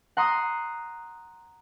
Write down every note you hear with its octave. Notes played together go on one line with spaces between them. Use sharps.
F#5 A#5 C6 D#6